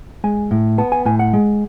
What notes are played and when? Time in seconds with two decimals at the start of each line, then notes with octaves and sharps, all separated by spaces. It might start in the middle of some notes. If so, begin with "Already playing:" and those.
0.24 G#3 G#5
0.51 A2
0.78 B3 A5
0.92 G#5
1.06 A2 G#5
1.19 F#5
1.33 G#3